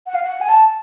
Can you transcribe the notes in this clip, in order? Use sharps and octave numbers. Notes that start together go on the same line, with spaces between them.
F#5
F5
F#5
G#5
A5